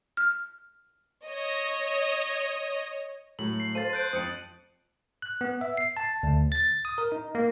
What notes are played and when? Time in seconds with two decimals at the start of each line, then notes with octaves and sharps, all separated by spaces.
0.17 F6
1.25 C#5 D#5
3.39 A2 F#3 F#7
3.60 C7
3.75 A4 C5 F5 A6 C7 D#7
3.93 F#6 G6 D7
4.13 F2 F3 D#6 C#7
5.22 F#6
5.41 B3
5.61 E5
5.77 C7
5.97 A5
6.23 D2
6.52 A6
6.85 D#6
6.98 A#4
7.12 D#4
7.35 A#3